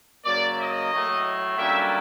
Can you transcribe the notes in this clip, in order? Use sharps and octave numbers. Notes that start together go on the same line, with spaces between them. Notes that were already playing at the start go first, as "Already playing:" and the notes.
C#3 F#3 A#3 D5
D#5
A2 F#3 A3
F#2 D3 G3 A#3 E5